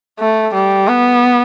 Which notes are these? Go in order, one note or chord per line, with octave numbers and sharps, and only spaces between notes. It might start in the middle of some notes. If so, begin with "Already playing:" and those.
A3
G3
B3